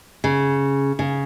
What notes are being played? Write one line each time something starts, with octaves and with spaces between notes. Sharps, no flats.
C#3
C#3